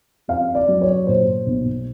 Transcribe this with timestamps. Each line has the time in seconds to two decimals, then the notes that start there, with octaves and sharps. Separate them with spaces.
0.28 F2 F5
0.55 D5
0.68 F#3
0.82 C#5
1.07 A#2 C5
1.47 B1